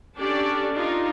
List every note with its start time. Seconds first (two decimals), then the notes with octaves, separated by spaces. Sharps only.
0.17 C#4 D4 G4 A4 D5
0.74 D4 D#4 F4